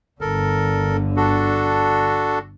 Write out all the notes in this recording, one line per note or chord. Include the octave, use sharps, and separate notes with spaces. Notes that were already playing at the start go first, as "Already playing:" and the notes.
G1 D3 A4 A#4
D4 F#4 A4